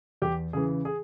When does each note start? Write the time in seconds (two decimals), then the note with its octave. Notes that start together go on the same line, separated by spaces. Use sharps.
0.22 E2 G4
0.53 C#3 E3 G#4
0.85 G#4